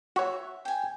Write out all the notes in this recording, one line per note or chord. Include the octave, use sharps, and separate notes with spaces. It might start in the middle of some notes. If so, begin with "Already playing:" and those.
F#4 C#5 E5
G5 G#5